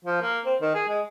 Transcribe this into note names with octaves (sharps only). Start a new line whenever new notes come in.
F3
A#3
C4
D#3
G#4
G#3